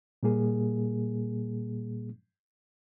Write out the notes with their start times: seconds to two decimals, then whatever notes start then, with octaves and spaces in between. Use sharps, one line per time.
0.23 A#2 G3 A#3 G#4